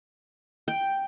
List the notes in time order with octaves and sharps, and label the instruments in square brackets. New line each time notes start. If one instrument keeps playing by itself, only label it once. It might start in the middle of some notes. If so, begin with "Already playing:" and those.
[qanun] G5